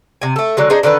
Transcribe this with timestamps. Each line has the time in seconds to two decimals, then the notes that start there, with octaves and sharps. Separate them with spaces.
0.22 C3 G#5
0.36 A3 A4
0.57 D3 F#3 G#3
0.70 D4 D#4 G#4 C5
0.83 D3 D#3 D4 B4